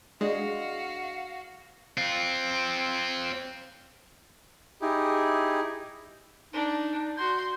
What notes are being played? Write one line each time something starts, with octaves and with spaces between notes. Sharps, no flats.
G#3 D4 E4 F#4 G#4 D5 D#5 F5
C4 F4
D#4 E4 G4 G#4
D4 D#4
F#4 C6 G6